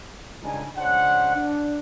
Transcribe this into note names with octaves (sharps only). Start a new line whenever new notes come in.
C#2 C#3 G3 D4 D#4 G#5
C#2 C#4 D4 C5 F#5
D4